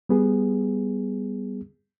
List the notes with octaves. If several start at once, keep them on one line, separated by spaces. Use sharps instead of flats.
G3 B3 G#4